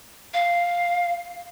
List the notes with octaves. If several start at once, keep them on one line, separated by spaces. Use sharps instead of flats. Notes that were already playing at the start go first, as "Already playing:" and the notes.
F5